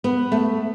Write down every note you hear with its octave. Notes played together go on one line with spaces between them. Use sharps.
B3
A3